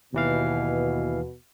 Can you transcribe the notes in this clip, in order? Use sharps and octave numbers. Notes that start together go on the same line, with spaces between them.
D#2 B2 E3 F5